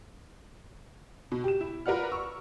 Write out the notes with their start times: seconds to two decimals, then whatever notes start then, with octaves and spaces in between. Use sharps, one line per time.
1.32 B2
1.44 G4 E7
1.61 E4
1.86 F4 A#4 B4 D5 F#5 F6
2.12 C#6 E6